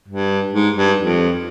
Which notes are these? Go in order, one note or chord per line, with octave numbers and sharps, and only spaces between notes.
G2
G#2
G2
F2